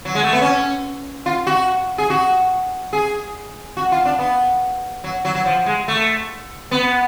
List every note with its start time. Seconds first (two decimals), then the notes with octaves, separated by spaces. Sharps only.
0.05 F#3
0.15 G#3
0.24 A3
0.33 B3
0.41 C#4
1.26 F4
1.47 F#4
1.98 G#4
2.10 F#4
2.93 G#4
3.77 F#4
3.92 F4
4.05 D4
4.19 B3
5.04 F#3
5.25 F#3
5.35 F#3
5.46 F3
5.66 G#3
5.88 A3
6.71 B3